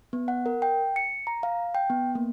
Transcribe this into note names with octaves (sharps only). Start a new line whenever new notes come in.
B3
F#5
A#4
G5
C#7
A#5
F5
G5
B3
A#3